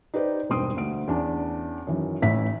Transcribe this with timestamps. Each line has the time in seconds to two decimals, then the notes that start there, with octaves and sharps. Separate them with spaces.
0.14 D#4 G4 B4 C5 D5
0.50 E1 G2 C4 C6 D#6 D7
0.77 D2 D7
1.07 E2 C#4 D4
1.87 F#2 D#3 E3
2.22 A1 A2 E3 D#4 E5 B6